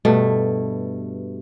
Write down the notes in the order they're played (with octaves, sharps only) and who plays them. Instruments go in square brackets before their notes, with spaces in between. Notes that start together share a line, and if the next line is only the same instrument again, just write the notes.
[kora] G2 B2 A3